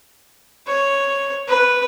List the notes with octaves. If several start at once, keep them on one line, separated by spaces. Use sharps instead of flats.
C#5
B4